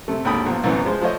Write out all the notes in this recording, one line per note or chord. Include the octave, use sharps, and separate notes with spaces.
C3 A3
G#1 D#2 D3 G5 B5 D#6
B1 F3
C2 F#2 A2 E3 B3
F3 G#3 C5
F3 A3 C5 C#5 D#5